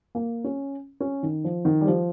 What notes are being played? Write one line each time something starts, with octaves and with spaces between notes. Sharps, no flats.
A#3
C#4
C#4
D#3
F3
D#3
G3
F3